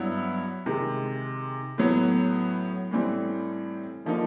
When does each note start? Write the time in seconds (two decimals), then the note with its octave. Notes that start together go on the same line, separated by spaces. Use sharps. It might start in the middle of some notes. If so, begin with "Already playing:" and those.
Already playing: G2 F#3 B3 E4
0.66 C3 D#3 G#3
1.78 A2 F#3 B3
2.91 A2 E3 G3 C4
4.05 D3 F3 A#3 D#4